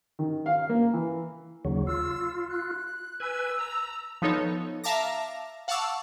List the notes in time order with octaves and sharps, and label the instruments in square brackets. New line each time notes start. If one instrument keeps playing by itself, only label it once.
[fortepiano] D#3
F5
A#3
E3
[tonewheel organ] D#2 C#3 F#3
[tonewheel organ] F4 [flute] E6
[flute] F#6
[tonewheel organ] B4 G#5 [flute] E6
[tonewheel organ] A#5
[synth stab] F3 B3 D#4 A4 C#5
E5 F5 A5 A#5 D6 A#6
F5 F#5 A5 C#6 D6 E6